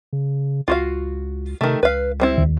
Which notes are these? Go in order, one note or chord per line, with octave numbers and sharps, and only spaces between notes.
C#3
C#2 F4 F#4 F5
C3 D#3 A3
C#2 B4 F5
G3 C4 E4
D#2